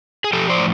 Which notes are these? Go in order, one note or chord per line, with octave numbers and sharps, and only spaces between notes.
G#4
F3 G4 A4
C5 D5
A2